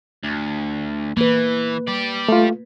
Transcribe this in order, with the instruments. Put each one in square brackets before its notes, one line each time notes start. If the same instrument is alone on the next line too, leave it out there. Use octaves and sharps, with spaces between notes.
[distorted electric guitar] D2
[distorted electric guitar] E3 [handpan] A#3 B4
[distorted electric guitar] G4 D5
[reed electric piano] A3 F4